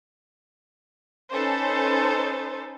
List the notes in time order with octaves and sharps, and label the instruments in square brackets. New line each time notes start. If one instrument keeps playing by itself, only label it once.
[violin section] C#4 D#4 A4 B4 C5